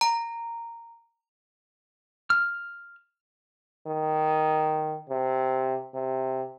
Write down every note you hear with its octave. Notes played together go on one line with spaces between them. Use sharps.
A#5
F6
D#3
C3
C3